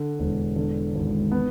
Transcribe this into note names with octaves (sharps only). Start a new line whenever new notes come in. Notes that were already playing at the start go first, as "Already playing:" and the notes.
Already playing: D3
E1
D3
G#1
B3